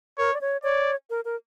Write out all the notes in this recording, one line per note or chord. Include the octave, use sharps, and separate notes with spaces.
A#4 C#5
D5
C#5
C#5 D5
A#4
A#4